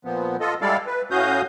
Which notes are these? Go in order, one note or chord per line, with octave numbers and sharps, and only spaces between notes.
A#2 F3 B3
F4 A4 D#5
G3 G#3 E4 A4 D5 F5
B4
A2 C#4 F#4 F5 D#6 G6